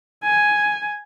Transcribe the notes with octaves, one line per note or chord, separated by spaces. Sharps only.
G#5